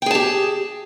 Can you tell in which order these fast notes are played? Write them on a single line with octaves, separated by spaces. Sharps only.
G5 G#4 A5 G4